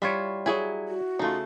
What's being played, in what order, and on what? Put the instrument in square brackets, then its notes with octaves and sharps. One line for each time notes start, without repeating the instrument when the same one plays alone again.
[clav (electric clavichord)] G3 C#5 [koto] E4 F4 E5
[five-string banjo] F#3 G#4 G#5 [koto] E4
[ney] F#4
[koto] C#3 A3 [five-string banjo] D#4 F4